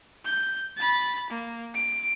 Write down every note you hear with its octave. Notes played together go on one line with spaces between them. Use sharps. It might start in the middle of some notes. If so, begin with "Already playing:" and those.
G6
B5 A6
A#3
D7